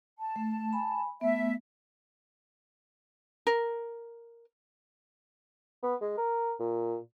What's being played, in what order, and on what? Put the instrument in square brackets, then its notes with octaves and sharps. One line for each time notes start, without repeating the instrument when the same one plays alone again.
[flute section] A5
[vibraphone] A3
G#5 B5
[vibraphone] A3 B3 [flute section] E5
[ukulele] A#4
[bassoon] B3
G#3
A#4
A#2